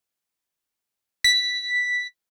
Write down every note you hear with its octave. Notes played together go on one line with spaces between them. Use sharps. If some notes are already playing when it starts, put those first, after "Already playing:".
B6